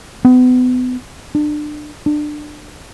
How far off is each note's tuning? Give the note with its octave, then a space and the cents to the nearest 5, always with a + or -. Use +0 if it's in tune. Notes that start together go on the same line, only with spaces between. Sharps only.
B3 +30
D4 +30
D4 +25